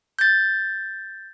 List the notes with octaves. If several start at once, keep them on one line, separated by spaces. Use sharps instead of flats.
G6 A6